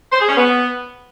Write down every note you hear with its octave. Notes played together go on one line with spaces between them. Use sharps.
C5
G#4
C#4
B3